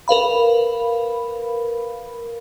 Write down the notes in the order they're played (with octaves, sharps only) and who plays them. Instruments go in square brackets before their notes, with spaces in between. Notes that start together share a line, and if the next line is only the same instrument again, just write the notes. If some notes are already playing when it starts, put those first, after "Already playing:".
[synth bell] A#4 B4 F5 B5